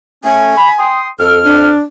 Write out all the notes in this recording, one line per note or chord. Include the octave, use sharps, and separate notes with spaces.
A3 C#4 G#5
B5
G5 C6 D#6
F2 A4 F6
D4